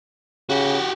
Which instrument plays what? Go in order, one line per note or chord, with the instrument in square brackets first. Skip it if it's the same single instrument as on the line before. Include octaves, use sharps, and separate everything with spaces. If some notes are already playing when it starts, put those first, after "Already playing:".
[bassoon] C#3 [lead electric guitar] F#4 G4